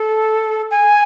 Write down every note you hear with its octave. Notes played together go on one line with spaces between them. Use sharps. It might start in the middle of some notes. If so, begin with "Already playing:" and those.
Already playing: A4
G#5